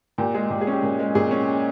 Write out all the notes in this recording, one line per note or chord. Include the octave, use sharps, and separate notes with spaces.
A#2 G4
G#3 G#4
A#2 G4
G#4
C#4
G4
A#2
G#3
A#2 G#4
C#4